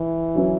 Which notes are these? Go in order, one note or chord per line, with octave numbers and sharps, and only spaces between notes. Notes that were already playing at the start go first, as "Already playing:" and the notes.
Already playing: E3
F#3 C#4 E4 B4